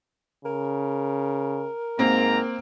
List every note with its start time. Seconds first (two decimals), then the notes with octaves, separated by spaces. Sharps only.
0.45 C#3 A#4
1.99 G#2 A#3 C4 A#5